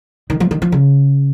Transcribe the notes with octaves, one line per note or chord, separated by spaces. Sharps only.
D#3
F3
D#3
F3
C#3